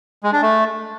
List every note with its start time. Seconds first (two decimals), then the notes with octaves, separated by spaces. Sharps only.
0.23 G#3
0.33 D4
0.42 A3